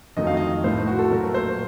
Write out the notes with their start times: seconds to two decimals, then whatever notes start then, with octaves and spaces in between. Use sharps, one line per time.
0.17 F2 D#3 F#3 A3 D#5
0.27 F5
0.37 D#5
0.64 A2 A3 C5
0.87 F#4
0.99 A4
1.11 A#2 F#3 A3 A#4
1.34 C5